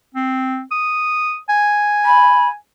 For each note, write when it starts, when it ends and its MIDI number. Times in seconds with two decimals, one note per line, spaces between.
0.15 0.62 60
0.71 1.37 87
1.49 2.55 80
2.05 2.47 83